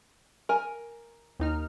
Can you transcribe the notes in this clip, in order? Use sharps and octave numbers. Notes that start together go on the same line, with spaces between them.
A#4 G#5
D#2 D#4 F6